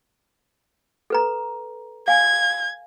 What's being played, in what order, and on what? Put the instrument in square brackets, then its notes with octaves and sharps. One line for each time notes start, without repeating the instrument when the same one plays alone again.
[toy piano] A4 B4 A#5
[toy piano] F5 G#5 [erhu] G#6